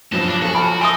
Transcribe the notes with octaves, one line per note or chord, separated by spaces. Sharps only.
G2 B2 F3 F#3 A5
D4
F#4 A4 G#5
F3 G#5 A5 B5 F6
D#4 E5 G#5 C6 D#6 A6